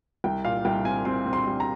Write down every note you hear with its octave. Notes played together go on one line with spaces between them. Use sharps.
C2 G5
A#2 F5
C2 G5
C4 G#5
C4 C6
C4
C6
G3
A#5